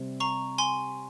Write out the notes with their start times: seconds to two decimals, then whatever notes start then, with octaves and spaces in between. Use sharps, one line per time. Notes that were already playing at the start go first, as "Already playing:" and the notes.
Already playing: C3 G3 C4
0.20 A#5 C#6
0.58 G#5 C6